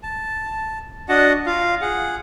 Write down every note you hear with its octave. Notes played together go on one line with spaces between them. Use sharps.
A5
D4 F#4 D#5 F#5 A5
F4 F5
G#4 F#5